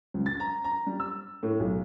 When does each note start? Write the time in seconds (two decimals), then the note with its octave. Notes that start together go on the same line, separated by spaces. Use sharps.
0.14 C#2
0.26 A6
0.40 A#5
0.64 A#5
0.87 G3
1.00 E6
1.43 A2
1.60 B1